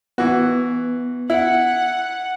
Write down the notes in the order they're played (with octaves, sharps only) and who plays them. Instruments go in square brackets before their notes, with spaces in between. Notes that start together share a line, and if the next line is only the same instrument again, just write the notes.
[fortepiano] E3 F#4 [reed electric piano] B3
[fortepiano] E4 [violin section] F#5